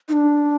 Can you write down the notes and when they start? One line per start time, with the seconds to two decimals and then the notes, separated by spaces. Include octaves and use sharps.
0.09 D#4
0.13 D4